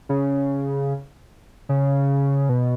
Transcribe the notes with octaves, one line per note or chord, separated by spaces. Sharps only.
C#3
C#3
B2